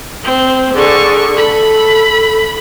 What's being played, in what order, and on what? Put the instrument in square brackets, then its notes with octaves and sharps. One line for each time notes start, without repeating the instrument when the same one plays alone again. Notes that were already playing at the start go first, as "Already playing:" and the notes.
[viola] C4
[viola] D3 C#6 [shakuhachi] G#4
[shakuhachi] A4 [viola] B5